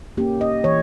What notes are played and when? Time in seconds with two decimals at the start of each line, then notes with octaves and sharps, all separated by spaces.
0.17 A#3 C#4 G4
0.41 D#5
0.64 E3 C#5